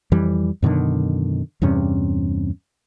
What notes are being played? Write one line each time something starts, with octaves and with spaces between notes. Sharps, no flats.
F2 E3 G3
F#2 B2 D3 D#3
E2 G2 C3 C#4